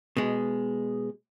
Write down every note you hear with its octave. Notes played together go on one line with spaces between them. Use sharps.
B2 G#3